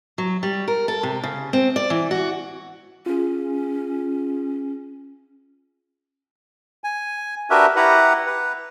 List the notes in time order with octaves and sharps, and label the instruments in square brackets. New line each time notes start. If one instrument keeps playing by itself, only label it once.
[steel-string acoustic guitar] F#3
G3
A#4
A4
C3
C#3
C4
D5
E3
F#4
[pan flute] C#4 [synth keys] F4 G#4
[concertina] G#5
D4 F#4 G4 A#4 B4 E5
E4 G4 B4 F#5 A#5
B4